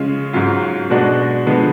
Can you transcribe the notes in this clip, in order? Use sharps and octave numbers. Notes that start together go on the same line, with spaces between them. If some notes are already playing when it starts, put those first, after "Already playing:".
Already playing: C#3 G#3 C#4 F4
G#2 F#3 C#4 F4
B2 G#3 D4 F#4
D3 F3 G#3 B3